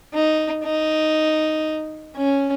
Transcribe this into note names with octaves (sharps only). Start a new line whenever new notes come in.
D#4
D#4
C#4